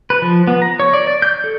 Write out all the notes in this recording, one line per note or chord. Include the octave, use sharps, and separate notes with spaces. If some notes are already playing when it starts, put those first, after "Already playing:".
B4
F3
B3
A#5
C#5
D5
D5
G6
A4